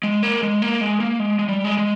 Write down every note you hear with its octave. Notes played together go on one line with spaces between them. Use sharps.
G#3
A#3
G#3
A#3
G#3
A#3
G#3
G#3
G3
G#3
G#3